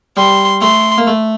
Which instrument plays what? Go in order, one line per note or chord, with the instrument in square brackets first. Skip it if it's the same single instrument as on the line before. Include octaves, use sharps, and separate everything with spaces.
[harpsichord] G3 [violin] C6
[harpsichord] A3 [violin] C6
[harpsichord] A#3
A3